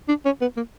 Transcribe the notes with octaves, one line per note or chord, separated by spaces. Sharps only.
D4
C#4
B3
A#3